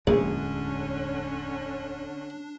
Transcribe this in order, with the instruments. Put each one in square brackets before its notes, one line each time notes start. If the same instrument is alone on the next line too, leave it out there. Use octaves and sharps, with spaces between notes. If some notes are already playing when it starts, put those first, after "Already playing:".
[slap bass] D1 E2 G#3 [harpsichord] A#1 [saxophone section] D3 C#4 [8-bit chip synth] D4